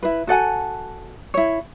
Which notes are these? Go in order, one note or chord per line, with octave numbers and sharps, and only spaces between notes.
E4 B4
F#4 A4 F#5 G#5
E4 C#5